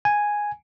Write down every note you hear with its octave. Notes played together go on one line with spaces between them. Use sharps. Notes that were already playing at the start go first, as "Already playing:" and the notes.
G#5